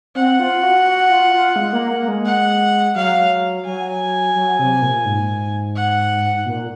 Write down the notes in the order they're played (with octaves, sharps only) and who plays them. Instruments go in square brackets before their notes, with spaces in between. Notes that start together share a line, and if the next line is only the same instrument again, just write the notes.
[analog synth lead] C4 [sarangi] F#5
[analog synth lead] F4
F#4
F#4
F4
F4
G#3
A#3
A#3
G#3
[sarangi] F#5
[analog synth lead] F#3 [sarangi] F5
[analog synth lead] F#3 [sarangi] G#5
[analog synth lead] F#3
C3
A#2
G#2
[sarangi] F#5
[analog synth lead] A#2